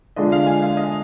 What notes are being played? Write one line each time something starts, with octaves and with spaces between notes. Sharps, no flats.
D3 F3 G#3 D4 D#5
F5
G#5
F5
D#5